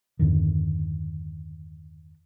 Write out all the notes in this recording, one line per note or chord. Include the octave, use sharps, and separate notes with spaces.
E2 G2 D3 D#3